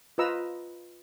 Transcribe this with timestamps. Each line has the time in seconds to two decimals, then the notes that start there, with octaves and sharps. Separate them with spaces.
0.18 F4 B4 C5 D#5 A#5 E6